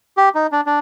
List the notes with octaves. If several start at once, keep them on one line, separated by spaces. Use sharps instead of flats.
G4
D#4
D4
D4